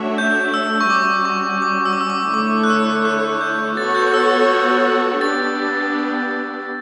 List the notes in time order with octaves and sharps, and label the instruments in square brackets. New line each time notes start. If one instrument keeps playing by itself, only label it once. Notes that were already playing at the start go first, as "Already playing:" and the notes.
Already playing: [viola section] A3 D4 F#4 C#5 E5
[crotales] G6
E6
C#6
[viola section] G3 C#4 F#4 [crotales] D6
[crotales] C#6
D6
E6
D6
E6
D6
[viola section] D3 A3 E4 A4 C#5 [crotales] D6
[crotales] F#6
E6
F#6
G6
[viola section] B3 F#4 A4 C#5 [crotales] A6
[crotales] G6
E6
E6
[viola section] B3 D4 G4 [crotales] A6